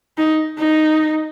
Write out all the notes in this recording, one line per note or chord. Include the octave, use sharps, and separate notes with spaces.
D#4
D#4